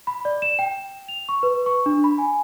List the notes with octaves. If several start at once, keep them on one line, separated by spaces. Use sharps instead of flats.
B5
D5
E7
G5
F7
C#6
B4
C#6
D4
B5
G#5